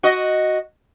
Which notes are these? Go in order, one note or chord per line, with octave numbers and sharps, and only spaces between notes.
F#4 D#5